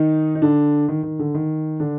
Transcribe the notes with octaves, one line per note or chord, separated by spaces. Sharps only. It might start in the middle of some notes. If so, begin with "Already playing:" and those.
Already playing: D#3 D#4
D#4
D3 D4
D#3
D#3
D3
D#3
D3 D4